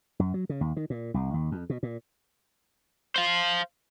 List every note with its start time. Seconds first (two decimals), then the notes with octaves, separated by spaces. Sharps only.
0.19 F#2
0.34 F#3
0.49 C#3
0.61 D#2
0.77 D#3
0.90 A#2
1.14 C2
1.34 D#2
1.52 F2
1.70 B2
1.83 A#2
3.16 C5 F5